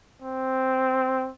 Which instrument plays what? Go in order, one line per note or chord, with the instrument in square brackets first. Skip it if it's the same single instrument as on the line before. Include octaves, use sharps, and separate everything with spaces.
[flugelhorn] C4